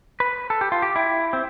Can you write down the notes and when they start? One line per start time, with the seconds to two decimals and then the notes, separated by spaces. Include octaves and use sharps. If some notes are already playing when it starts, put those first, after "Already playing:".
0.20 B4
0.50 A4
0.61 G4
0.72 F4
0.82 G4
0.96 E4
1.33 C4